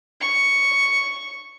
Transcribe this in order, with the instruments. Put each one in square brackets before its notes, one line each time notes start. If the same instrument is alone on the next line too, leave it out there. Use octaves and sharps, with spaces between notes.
[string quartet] C#6